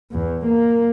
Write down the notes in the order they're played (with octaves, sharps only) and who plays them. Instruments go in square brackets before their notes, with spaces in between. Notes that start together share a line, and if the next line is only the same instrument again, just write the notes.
[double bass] E2
A#3